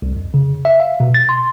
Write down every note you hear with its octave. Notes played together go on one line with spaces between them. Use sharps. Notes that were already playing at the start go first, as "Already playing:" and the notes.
C2
F2
C#3
E5
F5
B2
A6
C6